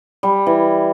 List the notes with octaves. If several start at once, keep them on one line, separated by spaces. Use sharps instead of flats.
G3
E3